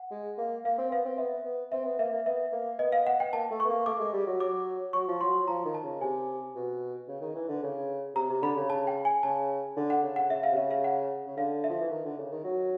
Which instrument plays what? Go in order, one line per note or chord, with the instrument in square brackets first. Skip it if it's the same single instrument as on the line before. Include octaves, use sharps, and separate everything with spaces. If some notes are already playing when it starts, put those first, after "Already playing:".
Already playing: [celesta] F#5
[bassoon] G#3
A#3
[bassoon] A#3 [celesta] F5
[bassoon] C4
[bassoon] B3 [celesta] F5
[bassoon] C4
[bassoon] B3 [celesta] E5
[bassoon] B3
[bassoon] C4 [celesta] E5
[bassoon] B3
[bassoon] A#3 [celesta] E5
[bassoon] A#3
[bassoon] B3 [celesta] E5
[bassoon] A#3
[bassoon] B3 [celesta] D#5
[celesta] F5
F#5
G5
[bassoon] A#3 [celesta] A5
[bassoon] A3
[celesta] C#6
[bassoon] B3
A#3
[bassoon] A3 [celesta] D6
[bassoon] G#3
G3
F#3
[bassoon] F#3 [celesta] D6
[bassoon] F#3 [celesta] C#6
[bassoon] F3
[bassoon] F#3 [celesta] C6
[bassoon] F3 [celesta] A#5
[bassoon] D#3
[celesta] A5
[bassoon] C#3
[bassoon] C3 [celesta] G#5
[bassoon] B2
C#3
D#3
E3
D3
C#3
[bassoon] C3 [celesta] A#5
[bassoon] C3
[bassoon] D3 [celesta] B5
[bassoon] C#3
[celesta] A5
G5
G#5
[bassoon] C#3 [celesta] A5
[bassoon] D3
[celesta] F#5
[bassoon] C#3
[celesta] F#5
[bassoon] C#3 [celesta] E5
[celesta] F5
[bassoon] C3
[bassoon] C#3 [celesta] E5
[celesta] F5
F#5
[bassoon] C#3
[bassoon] D3 [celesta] F5
[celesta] E5
[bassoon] F3
E3
D#3
D3
C#3
D#3
F#3